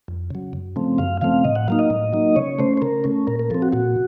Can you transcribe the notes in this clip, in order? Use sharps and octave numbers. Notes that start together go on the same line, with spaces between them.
F2
C#3 F#3
F#2
C#3 F3 A3 C4
F#2 F5
C#3 F3 A3 C4 F5
A2 D#5
F#5
F#3 A#3 D#4 F5
D#5
A2
F#3 A#3 D#4
C#3 C#5
A3 C#4 C5
C5
C#3 A#4
A3 C#4
A#2 A#4
A#4
F3 C4 A4
F#4
A#2 F#4